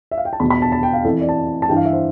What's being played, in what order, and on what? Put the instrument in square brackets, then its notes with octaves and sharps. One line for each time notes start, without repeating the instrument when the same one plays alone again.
[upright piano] E5
F5
G5
A5
E2 B2 B5
B5
A5
A5
G5
F5
F2 E3 A4
D5
A5
A5
G2 E3 G5
F5
E5
C5